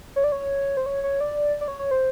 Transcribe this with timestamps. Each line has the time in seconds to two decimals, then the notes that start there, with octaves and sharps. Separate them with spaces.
0.16 C#5
0.24 D5
0.32 C#5
0.77 C5
0.86 C#5
1.04 C#5
1.20 D5
1.61 D5
1.68 C#5
1.79 C#5
1.91 C5